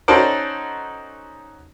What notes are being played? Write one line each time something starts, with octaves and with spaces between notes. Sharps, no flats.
C#4 D#4 F#4 A4 C5 D5